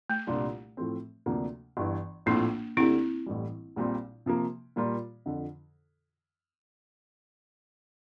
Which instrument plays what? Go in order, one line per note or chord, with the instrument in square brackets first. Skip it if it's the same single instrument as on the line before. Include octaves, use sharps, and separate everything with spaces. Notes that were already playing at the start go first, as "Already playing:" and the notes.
[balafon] A3
[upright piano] C2 A#2 G3 D4 F4
A2 F3 A3 C4
D2 C3 F3 A#3 D4
G1 G2 E3
[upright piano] A#1 A2 F3 C4 F4 [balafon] A#3 D4
[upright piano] D2 D3 A3 D4 G4 [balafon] C4 E4
[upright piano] A1 A2 E3 G3
A#1 A#2 G3 C4
C3 F3 A#3
A#2 G3 A#3 F4 A#4
F2 D3 F3